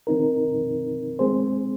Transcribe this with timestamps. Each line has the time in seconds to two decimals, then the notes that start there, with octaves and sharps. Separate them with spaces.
0.07 D#3 C4 D#4 A#4
1.19 G#3 C4 G#4 C5